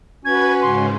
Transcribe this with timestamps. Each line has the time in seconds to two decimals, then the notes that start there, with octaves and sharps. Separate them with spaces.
0.25 C#4 F#4 B4 G#6
0.62 G#2 C#3 C6